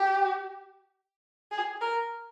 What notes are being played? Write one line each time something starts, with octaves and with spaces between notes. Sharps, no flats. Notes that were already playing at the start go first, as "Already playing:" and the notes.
Already playing: G4
G#4
A#4